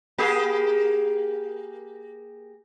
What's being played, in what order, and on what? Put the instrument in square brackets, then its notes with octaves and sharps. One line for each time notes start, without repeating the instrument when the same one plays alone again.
[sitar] A#3 G4 G#4